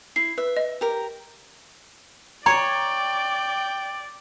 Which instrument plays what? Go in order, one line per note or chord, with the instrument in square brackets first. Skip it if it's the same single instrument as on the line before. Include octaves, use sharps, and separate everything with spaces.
[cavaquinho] E4 [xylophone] C7
[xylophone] B4 [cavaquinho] E5
[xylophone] D#5
[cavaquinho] G4 A#4
[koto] C#5 [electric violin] D5 [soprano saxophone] G5 [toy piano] A#5